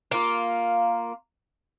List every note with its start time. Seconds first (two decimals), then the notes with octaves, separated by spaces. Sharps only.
0.11 A#3 F4